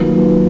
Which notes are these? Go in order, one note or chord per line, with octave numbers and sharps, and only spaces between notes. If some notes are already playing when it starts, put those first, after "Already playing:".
Already playing: D#3 F#3 A#3 F4 B4